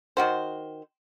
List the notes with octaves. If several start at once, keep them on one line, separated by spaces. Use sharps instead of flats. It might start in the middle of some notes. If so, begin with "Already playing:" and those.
D#3 F#4 C5